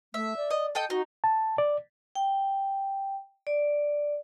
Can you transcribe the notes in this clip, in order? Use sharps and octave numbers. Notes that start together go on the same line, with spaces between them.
A3 E5
D5
D#5
A4 D#5 G5
D#4 F#4
A5
D5
G5
D5